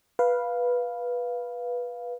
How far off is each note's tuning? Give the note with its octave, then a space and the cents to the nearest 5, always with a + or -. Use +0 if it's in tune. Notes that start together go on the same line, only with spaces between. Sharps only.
B4 -10 F5 +0